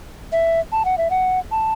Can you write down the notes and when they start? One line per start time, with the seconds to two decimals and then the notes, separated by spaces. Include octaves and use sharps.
0.32 E5
0.72 A5
0.85 F#5
0.98 E5
1.11 F#5
1.51 A5